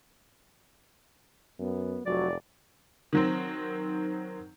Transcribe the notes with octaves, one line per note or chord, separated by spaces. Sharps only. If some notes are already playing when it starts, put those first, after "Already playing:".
F#2 B3
F1 F#3 D5
D#3 F#3 C4